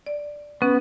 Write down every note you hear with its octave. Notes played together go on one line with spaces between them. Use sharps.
D5
B3 C#4